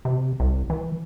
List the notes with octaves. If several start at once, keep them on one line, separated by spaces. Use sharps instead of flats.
C3
C2
E3